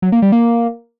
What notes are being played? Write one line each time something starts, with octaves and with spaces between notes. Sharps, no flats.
F#3
A#3
G3
A#3